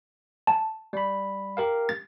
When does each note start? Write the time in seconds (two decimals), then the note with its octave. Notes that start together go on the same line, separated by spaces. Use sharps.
0.47 A5
0.93 G3 B5
1.57 G4 A#4 F5
1.89 A6